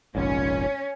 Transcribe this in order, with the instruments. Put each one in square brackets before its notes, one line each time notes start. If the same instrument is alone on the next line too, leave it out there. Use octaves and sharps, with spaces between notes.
[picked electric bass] F1 A#1 G#2 [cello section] C#4